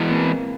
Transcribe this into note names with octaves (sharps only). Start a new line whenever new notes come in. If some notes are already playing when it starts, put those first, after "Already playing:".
Already playing: E3 G#3 B3
A#3 C4